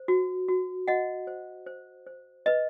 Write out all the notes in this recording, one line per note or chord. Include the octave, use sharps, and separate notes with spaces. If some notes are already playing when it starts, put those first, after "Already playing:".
Already playing: C5
F#4
F#4
F#4 D#5 F#5
C5
C5
C5
B4 D#5